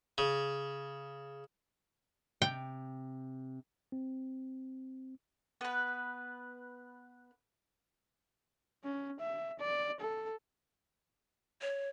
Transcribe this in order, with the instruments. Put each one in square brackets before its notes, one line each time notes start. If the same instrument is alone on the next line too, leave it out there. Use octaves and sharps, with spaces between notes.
[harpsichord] C#3
[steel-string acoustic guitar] C3 [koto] G5
[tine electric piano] C4
[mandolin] B3 B4
[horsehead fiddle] C#4
E5
D5
A4
[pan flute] C#5